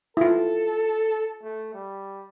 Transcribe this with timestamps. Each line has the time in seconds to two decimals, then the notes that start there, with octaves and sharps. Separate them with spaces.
0.17 E4 F4 A4
1.43 A3
1.74 G3